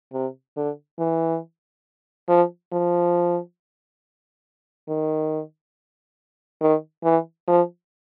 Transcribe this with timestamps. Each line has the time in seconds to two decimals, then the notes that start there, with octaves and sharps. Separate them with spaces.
0.13 C3
0.57 D3
0.99 E3
2.29 F3
2.73 F3
4.88 D#3
6.61 D#3
7.04 E3
7.48 F3